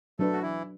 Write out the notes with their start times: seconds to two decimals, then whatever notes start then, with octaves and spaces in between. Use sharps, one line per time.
0.19 F#3 A3 D4 A4 B4
0.33 F#4
0.42 E3 E4